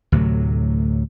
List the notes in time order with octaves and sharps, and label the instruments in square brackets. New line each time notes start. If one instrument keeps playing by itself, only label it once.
[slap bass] D2 A2 C3 F#3